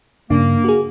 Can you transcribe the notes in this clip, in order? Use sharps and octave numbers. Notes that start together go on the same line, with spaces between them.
G2 C#3 A#3 D4
F#4 G#4